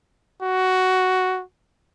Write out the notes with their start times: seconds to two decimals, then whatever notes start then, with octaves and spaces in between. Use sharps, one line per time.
0.42 F#4